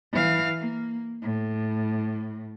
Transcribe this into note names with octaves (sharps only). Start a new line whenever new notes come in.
E3 F5
A#3
A2